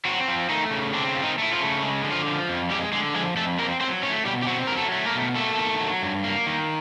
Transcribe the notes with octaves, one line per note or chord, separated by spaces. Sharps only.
F#3 C4 F#4
F3
D#3 A3 D#4
C#3
C4 D4
F3
D#3 D#4
A3 E4
F3 F4
C#3
G#3
D3
F3 F4
F3
F2
G3 G#3 G4
D3 G#3 G#4
F3 G#3 G#4
F2 A3 A4
A#3 C4 A#4
F#3 C4 C5
A3 C#4 C#5
B2 G3 G4
G4
F#3 C4 F#4
F#3 A#4
A3 A4
A3
A#3 A#4
B2
A3 A#3 A4
D#3
F#3
G2
A#3
D#3